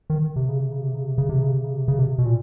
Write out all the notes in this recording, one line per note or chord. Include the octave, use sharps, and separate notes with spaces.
D#3
C3
C#3
C3
C#3
C3
C#3
C3
C#3
C3
C#3
C3
C#3
C3
C#3
C3
B2
A#2